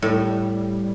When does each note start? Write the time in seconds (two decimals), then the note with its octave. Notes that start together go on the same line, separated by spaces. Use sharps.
0.02 A2 G3